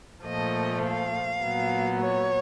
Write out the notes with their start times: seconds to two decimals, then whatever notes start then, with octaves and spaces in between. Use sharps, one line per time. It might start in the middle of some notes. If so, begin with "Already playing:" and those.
0.24 A#2 F3 A3 D#5
0.83 F5
1.42 A#2 F#3 B3
2.00 C#5